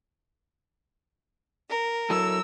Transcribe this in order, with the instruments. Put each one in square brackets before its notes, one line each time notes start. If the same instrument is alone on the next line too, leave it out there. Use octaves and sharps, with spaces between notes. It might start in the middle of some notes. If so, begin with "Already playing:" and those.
[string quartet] A#4
[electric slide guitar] F#3 E4 A4 [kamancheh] E6